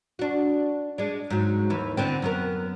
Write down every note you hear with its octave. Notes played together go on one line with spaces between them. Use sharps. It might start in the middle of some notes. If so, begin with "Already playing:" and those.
D4 F#4
G#3 D4
G#2 F#3
D#2 E3
D3 B3 C4
F#2 B3 A#4